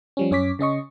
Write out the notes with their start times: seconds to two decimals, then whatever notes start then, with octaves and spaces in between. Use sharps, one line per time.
0.17 F3 G3 C#4
0.31 F#2 C#4 C#5 D6 B6
0.59 C#3 C#4 D#5 C#6